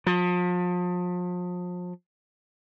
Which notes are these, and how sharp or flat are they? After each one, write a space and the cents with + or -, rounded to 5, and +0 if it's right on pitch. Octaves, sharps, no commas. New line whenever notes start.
F3 +35